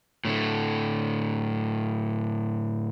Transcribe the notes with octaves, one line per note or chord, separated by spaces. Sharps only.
A2 D3 A3